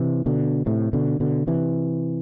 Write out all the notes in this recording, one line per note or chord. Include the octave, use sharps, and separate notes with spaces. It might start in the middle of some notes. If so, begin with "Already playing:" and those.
Already playing: C3 E3
B2 D3
A2 C3
B2 D3
B2 D3
C3 E3